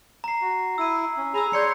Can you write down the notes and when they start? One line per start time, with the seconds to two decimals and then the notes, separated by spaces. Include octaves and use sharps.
0.24 A#5 C7
0.41 F#4
0.78 E4 E6 D#7
1.17 C#4
1.34 G#4 G#5 A#5 B5 E6
1.53 C#5 D5 C6 G6 G#6 C#7